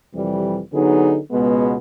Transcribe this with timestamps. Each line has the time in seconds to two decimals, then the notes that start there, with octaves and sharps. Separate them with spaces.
0.12 F2 C3 E3 G3
0.71 D3 F#3 B3 D#4 G#4
1.31 C#2 B2 G#3 B3